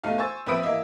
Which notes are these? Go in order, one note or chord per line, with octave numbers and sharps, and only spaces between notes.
B1 A3 D#4 F5
C5 G#5 C#6 E6 A6
A#1 C4 B4 E5 D#6 D7
E3 A#3 D#5 E5 E6